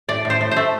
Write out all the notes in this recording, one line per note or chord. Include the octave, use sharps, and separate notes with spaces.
A2 D5
A2
C5
A2
C5
A3